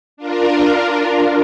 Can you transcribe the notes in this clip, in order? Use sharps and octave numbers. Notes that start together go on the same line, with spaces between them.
D4 F4 A#4